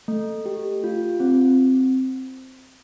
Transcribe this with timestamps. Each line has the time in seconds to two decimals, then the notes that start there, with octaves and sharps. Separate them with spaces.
0.08 A3
0.46 G4
0.84 F4
1.20 C4